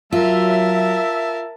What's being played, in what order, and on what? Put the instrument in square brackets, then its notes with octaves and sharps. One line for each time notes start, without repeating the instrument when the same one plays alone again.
[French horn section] F#3 [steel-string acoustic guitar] F4 [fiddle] A#4 A5 [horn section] E5